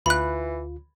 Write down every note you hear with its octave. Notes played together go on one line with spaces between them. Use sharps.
D2 E3 F4 B5 F#6